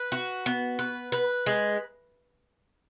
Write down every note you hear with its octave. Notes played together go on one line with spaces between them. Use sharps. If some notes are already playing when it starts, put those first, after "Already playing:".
Already playing: B4
F#4
B3
B4
B4
G#3